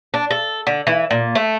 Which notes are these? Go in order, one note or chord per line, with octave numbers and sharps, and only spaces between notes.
D4
A4
D3
E3
A#2
A3